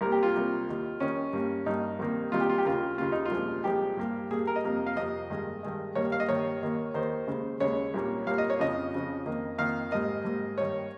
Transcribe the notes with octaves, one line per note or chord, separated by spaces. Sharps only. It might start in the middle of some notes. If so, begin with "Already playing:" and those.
C2 C3 G3 A#3 A#4
G4
F4
C2 C3 G3 A#3
D#2 D#3 G3
D#2 D#3 G3 C#4
G2 G3 A#3
G2 G3 A#3 D#4
C2 C3 D#3 G3 A#3
C2 C3 D#3 G3 A#3 F4
G4
F4
G4
D#2 C#3 G3 A#3 F4
D#2 C#3 G3 A#3 F4
D#4
F4
C2 A#2 F3 G#3
C2 A#2 F3 G#3 G4
G2 G3 A#3
G2 G3 A#3 G#4
A#4
D#5
F2 C3 G3 A#3
F5
F2 C3 G3 A#3 D#5
G2 D#3 G#3
G2 D#3 G#3
G2 D#3 G3 A#3 C#5
F5
D#5
G2 D#3 G3 A#3 C#5
D#2 D#3 A#3
D#2 D#3 A#3 C5
D#2 C#3 G#3
D#2 C#3 G#3 C#5
C2 A#2 G3 A#3
C2 A#2 G3 A#3 F5
D#5
C#5
F2 C#3 F3 D#5
F2 C#3 F3
F2 D#3 A#3
F2 D#3 A#3 F5
G#2 G3 A#3 D#5
G#2 G3 A#3
G2 D#3 G3 C#5